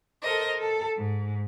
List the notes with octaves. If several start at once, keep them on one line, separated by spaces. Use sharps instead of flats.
A4 A#4 C5 D#5
A4
G#2